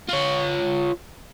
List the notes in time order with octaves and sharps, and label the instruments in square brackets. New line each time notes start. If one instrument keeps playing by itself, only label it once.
[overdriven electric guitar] F4 C#5